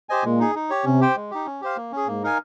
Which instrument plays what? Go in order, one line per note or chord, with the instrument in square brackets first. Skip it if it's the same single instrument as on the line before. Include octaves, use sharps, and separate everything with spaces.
[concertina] G4 C5 D#5 G#5
[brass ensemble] A#2 [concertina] G#3
[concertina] D#4 G#4
D#4
G4 C#5
[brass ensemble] C3 [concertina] C#4
[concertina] G4 C5 G5
G#3
D#4 G4
C#4
G4 C5 F5
A#3
C#4 G#4
[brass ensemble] G#2 [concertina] A#3
[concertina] D#4 A#4 F5 G#5